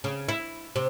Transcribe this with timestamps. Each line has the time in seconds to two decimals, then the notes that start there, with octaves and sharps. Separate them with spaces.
0.04 C#3
0.29 E4
0.76 C3